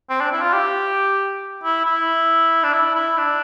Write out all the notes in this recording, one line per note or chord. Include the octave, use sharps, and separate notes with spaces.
C4
D4
E4
F4
G4
E4
E4
D4
E4
E4
D4